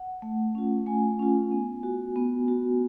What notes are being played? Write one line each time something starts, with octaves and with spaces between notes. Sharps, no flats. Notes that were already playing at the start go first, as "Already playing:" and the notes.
Already playing: F#5
A3
C#4 F4
A3 G#5
C#4 F4
B3
F#4
B3
F#4